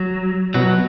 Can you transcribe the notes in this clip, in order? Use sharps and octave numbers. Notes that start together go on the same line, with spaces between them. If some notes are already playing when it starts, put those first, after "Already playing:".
Already playing: F#3
B2 F#3